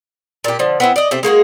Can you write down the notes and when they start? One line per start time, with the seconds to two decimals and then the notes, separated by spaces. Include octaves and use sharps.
0.44 A#2 G4
0.59 D3 F3
0.80 B3 C4 E4
0.96 D5 D#5
1.11 C3 A3 C4
1.23 G#3 A#3 F#4 G#4